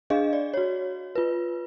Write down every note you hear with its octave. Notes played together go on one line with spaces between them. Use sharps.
D4 G#4 D#5 F5
D5
F#4 C#5
F4 B4